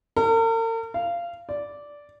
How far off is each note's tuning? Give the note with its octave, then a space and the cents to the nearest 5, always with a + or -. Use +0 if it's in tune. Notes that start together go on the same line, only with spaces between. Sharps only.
A#4 -45
F5 -20
D5 -10